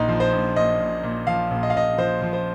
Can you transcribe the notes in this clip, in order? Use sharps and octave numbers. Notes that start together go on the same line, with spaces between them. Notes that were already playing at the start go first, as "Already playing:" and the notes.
Already playing: A#1 D#4
F3
C5
A#1
A#2 D#5
A#2
A#2
F3 F5
A#1
D#5
F5
A#1 D#5
F3 C5
F3
C5